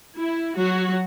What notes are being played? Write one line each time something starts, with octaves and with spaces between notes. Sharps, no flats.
E4
F#3 F#4